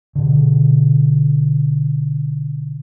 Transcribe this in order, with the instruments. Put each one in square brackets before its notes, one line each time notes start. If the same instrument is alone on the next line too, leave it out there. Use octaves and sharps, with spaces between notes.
[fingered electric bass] B2 D3